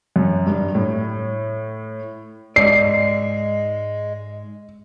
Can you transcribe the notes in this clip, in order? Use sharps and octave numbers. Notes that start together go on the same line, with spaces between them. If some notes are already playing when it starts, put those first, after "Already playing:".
F#2
G2
A2
G#2 G#3 D5 C7